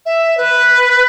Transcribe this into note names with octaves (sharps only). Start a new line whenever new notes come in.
E5
B4